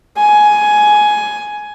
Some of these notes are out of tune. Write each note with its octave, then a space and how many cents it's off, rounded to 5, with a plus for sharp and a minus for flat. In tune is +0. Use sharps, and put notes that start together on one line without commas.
G#5 +10